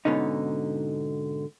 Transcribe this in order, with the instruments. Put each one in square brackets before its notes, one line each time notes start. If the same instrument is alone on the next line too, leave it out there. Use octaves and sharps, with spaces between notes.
[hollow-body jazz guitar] G#2 B2 D3 C#4 D#4